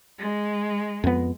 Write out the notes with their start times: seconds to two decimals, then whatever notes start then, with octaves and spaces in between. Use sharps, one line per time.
0.18 G#3
1.04 F2 B3